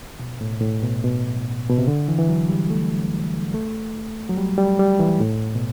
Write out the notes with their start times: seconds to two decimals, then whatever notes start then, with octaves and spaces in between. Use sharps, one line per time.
0.19 B2
0.41 A2
0.61 A2
0.82 B2
1.04 B2
1.69 B2
1.78 C3
1.88 D3
2.08 E3
2.19 E3
2.29 F#3
2.49 G3
2.70 A3
3.54 A3
4.29 F#3
4.37 G3
4.58 G3
4.79 G3
4.99 E3
5.20 A2
5.55 B2